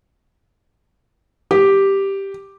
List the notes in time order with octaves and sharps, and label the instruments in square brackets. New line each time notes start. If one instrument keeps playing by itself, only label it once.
[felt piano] G4